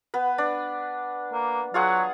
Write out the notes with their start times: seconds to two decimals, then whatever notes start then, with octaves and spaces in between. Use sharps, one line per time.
0.14 B3 B4
0.38 D4
1.33 A#3
1.74 F#3 F4 G#4 F#5